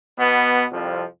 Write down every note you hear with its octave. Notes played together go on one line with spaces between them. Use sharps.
B2 B3
C2 F2 F3